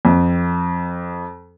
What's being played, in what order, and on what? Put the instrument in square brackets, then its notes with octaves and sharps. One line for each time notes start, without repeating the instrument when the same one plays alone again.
[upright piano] F2